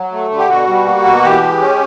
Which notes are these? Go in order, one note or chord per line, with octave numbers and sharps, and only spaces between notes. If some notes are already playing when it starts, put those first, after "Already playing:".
Already playing: F#3
A3
D3
G4
B2 F#4
G3
A#3
B2
E3 G4
G#3
C#4